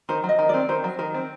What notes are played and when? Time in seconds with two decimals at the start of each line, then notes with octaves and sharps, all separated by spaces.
0.09 D#3 C5
0.24 F#3
0.29 D#5
0.39 D#3
0.49 C4 D5
0.69 D#3 C5
0.84 F#3
0.99 D#3 A#4
1.14 C4